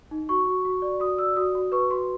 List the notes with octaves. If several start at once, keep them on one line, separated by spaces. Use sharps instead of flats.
D#4
F#4 C#6
F#4
F#4
D5
F#4 D#6
D5 E6
F#4 D#6
F#4
B4 C#6
F#4 C6